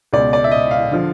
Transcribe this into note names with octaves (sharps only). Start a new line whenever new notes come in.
C#2 B2 D5
D5
E5
D#5
F5
D3 F3